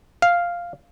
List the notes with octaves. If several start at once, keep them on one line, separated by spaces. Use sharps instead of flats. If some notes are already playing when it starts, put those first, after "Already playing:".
F5